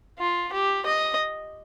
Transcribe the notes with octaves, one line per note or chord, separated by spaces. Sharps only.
F4
G4
D#5